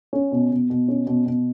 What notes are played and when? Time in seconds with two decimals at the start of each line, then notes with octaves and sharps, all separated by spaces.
0.13 C#4
0.32 B2
0.51 B2
0.70 B2
0.88 C#4
1.07 B2
1.26 B2